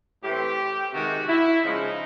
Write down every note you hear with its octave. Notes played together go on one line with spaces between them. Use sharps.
A2 E3 A3 C4 G4
C3 D#3 G#3 F#4
E4
C#3 F3 G#3 C#4 D#4